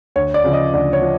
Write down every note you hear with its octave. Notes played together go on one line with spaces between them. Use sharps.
D2 C#5
D5
C#3 F3
D#5
D2 D5
C#5
F3